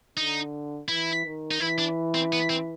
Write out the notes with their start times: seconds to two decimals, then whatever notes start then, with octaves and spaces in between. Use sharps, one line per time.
0.17 D3 D#4
0.88 E3 E4
1.25 D#3
1.51 D#4
1.60 E3 E4
1.78 D4
2.14 C4
2.33 B3
2.50 C4